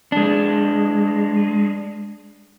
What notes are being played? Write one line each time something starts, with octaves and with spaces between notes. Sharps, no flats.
G#3 D4